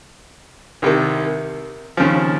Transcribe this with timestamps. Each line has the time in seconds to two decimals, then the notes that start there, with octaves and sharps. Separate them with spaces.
0.82 C2 C3 D#3
1.97 D#2 C#3 F3